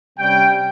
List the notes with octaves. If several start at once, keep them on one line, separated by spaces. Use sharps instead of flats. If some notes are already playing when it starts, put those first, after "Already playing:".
C3 G3 C#4 G5